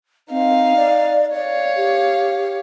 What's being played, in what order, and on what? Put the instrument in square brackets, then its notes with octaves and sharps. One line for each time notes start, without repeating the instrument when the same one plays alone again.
[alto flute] C4 [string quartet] D#4 F5
[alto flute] D5
[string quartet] C#5 F5 [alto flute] D5
[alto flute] G4